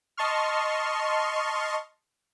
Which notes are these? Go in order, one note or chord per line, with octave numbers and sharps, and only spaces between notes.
D#5 A5 C6 C#6 F6